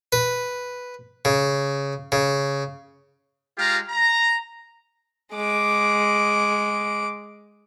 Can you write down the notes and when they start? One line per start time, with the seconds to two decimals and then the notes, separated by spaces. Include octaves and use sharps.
0.12 B4
1.25 C#3
2.12 C#3
3.58 G#3 F4 G4 F5 A#5
3.89 A#5
5.35 G#3 D6